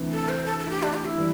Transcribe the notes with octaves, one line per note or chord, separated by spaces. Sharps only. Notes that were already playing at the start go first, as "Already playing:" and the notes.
Already playing: D2 C3 E3
A4
C5
A4
A4
E4
G4
D4
G4
E4
E3 G3